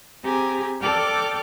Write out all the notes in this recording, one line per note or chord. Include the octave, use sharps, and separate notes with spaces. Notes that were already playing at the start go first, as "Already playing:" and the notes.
C4 G4 G#4 G#5 A#5
A4 D5 G5 A5 D6 F6